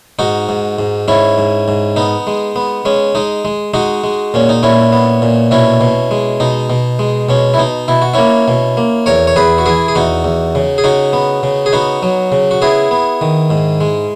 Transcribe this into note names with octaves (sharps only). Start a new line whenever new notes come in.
G#2 D#4 F#4
G#2
G#2
G#2 C#4 E4
G#2
G#2
B3 D#4
G#3
B3
G#3 C#4
G#3 D#4
G#3
G#3 D#4 F#4
G#3
A#2 C#4
D#4
A#2 C#4 E4
B3
A#2
B2 C#4 E4
B2
G#3
B2 D#4
B2
G#3
B2 C#4
E4
B2 D#4
B2 E4
F#4
A#3 C#4 E4
B2
A#3
E2 A#4 C#5
C#5
E2 G#4 B4
F#4
E3 E4 G#4
G#4
E2 D#4 F#4
E2
C#3
G#4
C#3 D#4 F#4
B3
C#3
G#4
B3 D#4 F#4
F#3
C#3
F#4
B3 E4 G#4
B3
D#3
G#2
G#3